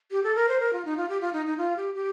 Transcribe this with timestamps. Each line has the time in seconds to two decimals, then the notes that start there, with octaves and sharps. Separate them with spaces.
0.11 G4
0.24 A4
0.35 A#4
0.49 C5
0.60 A#4
0.73 F4
0.85 D#4
0.97 F4
1.09 G4
1.21 F4
1.33 D#4
1.46 D#4
1.58 F4
1.77 G4
1.94 G4